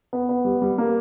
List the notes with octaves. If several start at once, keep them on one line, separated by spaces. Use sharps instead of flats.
B3
B3
G3
G3
A#3